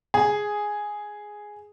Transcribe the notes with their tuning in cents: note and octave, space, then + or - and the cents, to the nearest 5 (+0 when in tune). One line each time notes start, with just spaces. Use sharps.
G#4 +0 G#5 +0